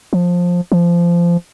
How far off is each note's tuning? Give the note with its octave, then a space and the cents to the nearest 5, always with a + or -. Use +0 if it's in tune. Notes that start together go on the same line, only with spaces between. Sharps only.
F3 +15
F3 -20